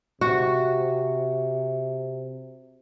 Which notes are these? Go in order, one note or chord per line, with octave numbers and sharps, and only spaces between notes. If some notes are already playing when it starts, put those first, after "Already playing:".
C3 F#4